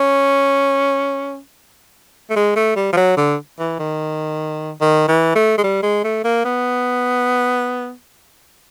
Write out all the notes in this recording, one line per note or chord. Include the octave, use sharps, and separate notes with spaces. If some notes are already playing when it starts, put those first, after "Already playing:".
Already playing: C#4
A3
G#3
A3
G3
F3
F#3
D3
E3
D#3
D#3
E3
A3
G#3
G3
G#3
A3
A#3
B3